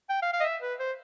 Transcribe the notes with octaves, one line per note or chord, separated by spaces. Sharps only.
G5
F5
F5
D#5
E5
B4
C5